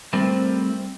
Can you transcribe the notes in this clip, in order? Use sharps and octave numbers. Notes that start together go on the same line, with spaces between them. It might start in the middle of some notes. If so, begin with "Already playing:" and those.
G3 A3 C4 E4 A#4 C5